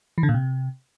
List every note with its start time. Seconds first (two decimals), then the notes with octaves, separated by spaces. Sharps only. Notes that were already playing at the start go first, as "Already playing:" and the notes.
0.18 E3
0.23 D3
0.29 A#2
0.34 C3